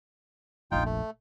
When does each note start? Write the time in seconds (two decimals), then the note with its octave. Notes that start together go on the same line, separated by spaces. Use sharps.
0.72 F1 A#1 D#4 F4 G5
0.85 A3